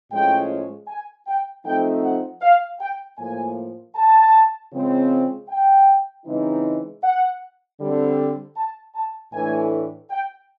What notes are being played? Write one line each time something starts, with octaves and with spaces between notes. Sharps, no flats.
A2 F3 G#3 C#4 G5
G#5
G5
F3 A3 C4 D#4 G5
F#5
F5
G5
A2 F3 A#3 G#5
A5
C#3 F3 G#3 C4
G5
C#3 E3 G#3 C4 D#4
F#5
D3 G3 C4
A5
A5
A2 E3 A3 D4 G#5
G5